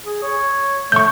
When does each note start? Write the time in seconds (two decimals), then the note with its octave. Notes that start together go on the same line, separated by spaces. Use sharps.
0.05 G#4
0.23 C#5
0.92 A3 C#6 G6